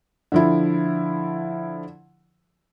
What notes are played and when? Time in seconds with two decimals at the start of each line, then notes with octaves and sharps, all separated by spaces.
0.32 D3 F3 E4